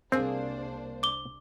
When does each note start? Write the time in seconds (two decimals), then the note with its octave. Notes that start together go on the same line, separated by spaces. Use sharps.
0.12 C2 A#3 C4 D4 G#4 C5
1.03 D6 G7